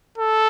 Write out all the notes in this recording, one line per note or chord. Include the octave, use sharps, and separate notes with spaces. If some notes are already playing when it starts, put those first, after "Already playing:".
A4